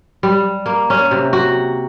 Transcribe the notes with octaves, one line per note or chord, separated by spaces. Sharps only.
G3
A#3
C#4
C3
F#4